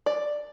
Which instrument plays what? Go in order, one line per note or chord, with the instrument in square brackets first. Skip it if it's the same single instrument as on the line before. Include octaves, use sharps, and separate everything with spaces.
[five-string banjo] D5